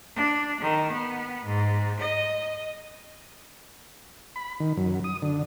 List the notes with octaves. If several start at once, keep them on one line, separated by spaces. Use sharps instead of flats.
D4
D#3
B3
G#2
D#5
B5
D#3
F#2
D#6
D3